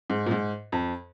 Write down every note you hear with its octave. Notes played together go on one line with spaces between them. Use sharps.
G#2
A#2
G#2
F2